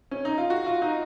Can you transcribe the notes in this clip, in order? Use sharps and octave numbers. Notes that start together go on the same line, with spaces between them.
C#4
D#4
F4
F#4
F4
D#4